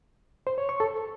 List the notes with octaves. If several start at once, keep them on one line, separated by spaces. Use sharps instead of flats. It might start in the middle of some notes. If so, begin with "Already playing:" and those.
C5
C#5
C#6
A4